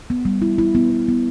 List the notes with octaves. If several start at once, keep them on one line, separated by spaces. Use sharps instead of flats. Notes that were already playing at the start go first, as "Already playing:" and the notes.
B3
G3
E4
E4
B3
B3
B3